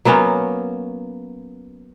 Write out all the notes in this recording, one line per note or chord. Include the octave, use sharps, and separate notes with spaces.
F#3 A#3 B3 C#4